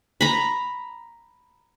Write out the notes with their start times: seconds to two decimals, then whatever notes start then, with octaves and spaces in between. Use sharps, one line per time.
0.21 A#5 B5